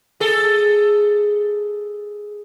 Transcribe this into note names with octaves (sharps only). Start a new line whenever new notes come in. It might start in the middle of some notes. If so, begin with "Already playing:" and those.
G#4 A4